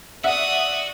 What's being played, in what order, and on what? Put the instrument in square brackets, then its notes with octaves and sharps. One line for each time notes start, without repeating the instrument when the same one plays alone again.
[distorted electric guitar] F#4 [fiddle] D5 D#6 [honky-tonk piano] E5 F#5